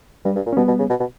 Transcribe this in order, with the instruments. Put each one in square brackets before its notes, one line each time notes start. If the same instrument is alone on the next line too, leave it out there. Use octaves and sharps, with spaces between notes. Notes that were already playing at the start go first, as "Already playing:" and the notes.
[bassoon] G2 [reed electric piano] G3
[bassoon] G2
A#2
[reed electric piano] C#4
[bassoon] B2 [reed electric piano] G3 B3
[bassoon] B2
C#3
B2
B2